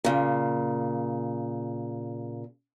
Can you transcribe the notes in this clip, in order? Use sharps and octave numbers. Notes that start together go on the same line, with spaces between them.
A#2 C#3